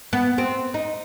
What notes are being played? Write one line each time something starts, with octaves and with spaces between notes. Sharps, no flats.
B3
C4
D#4